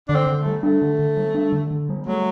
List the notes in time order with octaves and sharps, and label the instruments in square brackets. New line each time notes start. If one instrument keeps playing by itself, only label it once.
[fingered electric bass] D3 [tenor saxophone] D4
[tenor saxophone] C4
[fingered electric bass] D3
[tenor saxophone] A3
[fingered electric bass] G3
[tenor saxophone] A3 [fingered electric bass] D4
[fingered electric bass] D3
D3
G3
D4
D3
D3
G3
[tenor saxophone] F#3 [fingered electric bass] A3